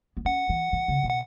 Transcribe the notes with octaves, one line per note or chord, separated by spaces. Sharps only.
B3
C#4 F#5
E3
E3
C#3
B2
F#5